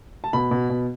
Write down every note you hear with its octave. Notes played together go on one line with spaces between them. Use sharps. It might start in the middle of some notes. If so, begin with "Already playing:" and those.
A5
B2 B5
B2
B2